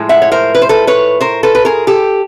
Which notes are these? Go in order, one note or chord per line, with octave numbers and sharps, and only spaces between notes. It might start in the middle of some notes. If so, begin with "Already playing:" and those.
Already playing: A2 F3 G#3
E5 F#5
C#5
A#4 C5
B4
C5
A4 B4
B4 C#5
A#4 C5
A4 B4
B4
G#4 A#4
G4 A4